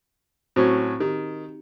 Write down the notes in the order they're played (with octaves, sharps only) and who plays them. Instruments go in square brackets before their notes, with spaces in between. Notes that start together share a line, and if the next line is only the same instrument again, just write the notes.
[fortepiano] A2 F#3 C#4 [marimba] C4 F#4 C5
[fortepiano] D#3 [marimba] D#4 G4